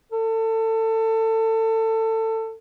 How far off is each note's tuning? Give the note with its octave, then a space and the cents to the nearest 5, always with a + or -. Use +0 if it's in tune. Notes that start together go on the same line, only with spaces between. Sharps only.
A4 +25